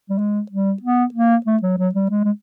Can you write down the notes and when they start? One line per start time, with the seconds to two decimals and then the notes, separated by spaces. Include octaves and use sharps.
0.10 G3
0.18 G#3
0.51 G3
0.82 B3
1.14 A#3
1.46 A3
1.62 F#3
1.78 F#3
1.94 G3
2.10 G#3
2.24 G#3